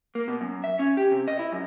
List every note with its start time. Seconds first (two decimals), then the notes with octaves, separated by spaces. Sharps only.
0.15 A#3
0.28 B2
0.41 F#2
0.64 E5
0.79 C#4
0.97 G4
1.12 C3
1.28 D#5
1.39 E4
1.52 F#2